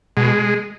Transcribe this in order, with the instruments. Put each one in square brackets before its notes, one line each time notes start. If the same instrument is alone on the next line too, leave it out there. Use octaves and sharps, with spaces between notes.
[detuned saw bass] B2 [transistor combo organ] G#3